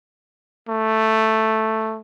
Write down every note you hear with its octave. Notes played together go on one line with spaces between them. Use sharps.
A3